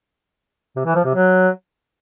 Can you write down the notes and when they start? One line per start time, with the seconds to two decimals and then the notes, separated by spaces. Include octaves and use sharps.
0.76 C3
0.86 E3
0.95 F3
1.05 C3
1.14 F#3